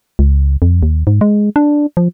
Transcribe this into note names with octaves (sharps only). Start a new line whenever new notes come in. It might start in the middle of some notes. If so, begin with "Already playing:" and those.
C#2
F2
D#2
G#2
G#3
D4
F3